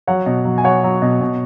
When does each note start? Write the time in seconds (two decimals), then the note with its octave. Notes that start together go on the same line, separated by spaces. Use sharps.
0.07 F#3 C#5 F#5
0.26 B2
0.45 F#3
0.58 G#5
0.64 F#3 C#5 F#5
0.84 F#3
1.02 B2
1.21 B2